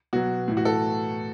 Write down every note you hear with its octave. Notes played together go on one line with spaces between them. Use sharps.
B2 F#3 F#4
A2 E3
F#4
A4